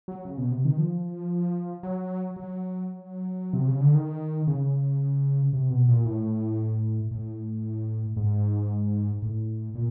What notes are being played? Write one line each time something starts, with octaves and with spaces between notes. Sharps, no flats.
F#3
C#3
B2
C3
D#3
F3
F#3
F#3
C3
C#3
D3
D#3
C#3
C3
B2
A#2
A2
A2
G#2
A2
A#2